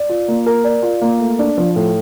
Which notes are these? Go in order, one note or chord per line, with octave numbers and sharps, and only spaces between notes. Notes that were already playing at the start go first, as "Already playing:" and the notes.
Already playing: D5
F4
A#3
A#4
D5
F4
A#3
A3
D4
F3
A2